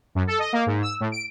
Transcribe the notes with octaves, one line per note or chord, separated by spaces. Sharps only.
F#2
A4
D#5
A#3
G#2
E6
A2
D7